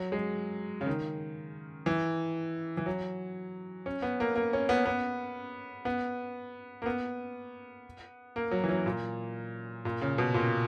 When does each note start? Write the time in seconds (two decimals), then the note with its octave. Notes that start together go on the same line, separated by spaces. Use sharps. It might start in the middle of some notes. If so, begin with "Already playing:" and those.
Already playing: F#3
0.12 G#3
0.81 C#3
0.86 D#3
1.86 E3
2.77 E3
2.86 F#3
3.86 C#4
4.02 B3
4.20 A#3
4.36 A#3
4.53 C#4
4.69 B3
4.85 B3
5.85 B3
6.82 A#3
6.86 B3
8.36 A#3
8.51 F#3
8.64 E3
8.69 F#3
8.86 A#2
9.85 A#2
10.01 C#3
10.18 B2
10.34 A#2